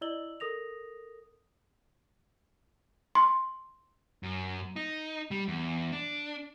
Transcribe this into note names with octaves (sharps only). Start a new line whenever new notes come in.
E4 D5 D#5 E6 F#7 G7
A4 A#4 D#6 A#6 F7
C6
F#2
D#4
G3
E2
D4